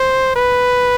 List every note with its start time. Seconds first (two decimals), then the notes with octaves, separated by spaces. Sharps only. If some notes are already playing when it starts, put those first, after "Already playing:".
Already playing: C5
0.36 B4